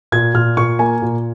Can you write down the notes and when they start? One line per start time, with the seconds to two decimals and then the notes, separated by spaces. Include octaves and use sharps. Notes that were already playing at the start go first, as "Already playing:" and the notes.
0.12 A#2 G#6
0.34 A#2 F6
0.57 A#2 C#6
0.79 A#3 G#5
1.02 A#2